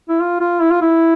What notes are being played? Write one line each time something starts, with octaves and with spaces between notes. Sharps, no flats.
E4
F4
F4
E4
F4
E4